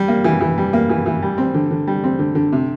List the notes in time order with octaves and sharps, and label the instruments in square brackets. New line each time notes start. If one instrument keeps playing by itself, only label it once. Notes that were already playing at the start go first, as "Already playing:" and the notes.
Already playing: [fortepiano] G3
A#3
E3
E3
G3
A#3
E3
E3
G3
C4
D3
D3
G3
C4
D3
D3
C3